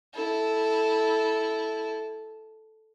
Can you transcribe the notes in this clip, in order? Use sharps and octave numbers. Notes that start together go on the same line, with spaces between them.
E4 A4